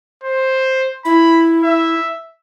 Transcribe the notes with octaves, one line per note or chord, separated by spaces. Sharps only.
C5
E4 B5
E5